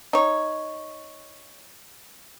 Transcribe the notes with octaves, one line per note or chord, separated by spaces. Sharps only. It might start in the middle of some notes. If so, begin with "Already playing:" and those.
D#4 C#5